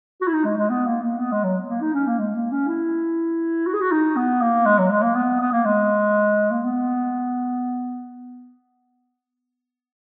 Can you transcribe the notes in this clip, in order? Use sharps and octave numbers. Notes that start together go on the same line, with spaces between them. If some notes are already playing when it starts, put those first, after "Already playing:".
F#4
E4
D#4
G#3
G#3
B3
A#3
A#3
B3
G#3
F#3
A#3
D#4
C#4
A#3
G#3
A#3
C#4
E4
F#4
G#4
F#4
D#4
B3
A#3
G#3
F#3
G#3
A#3
B3
B3
A#3
G#3
A#3
B3